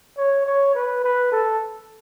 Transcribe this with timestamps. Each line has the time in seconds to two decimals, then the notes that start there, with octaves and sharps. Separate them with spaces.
0.17 C#5
0.46 C#5
0.75 B4
1.04 B4
1.32 A4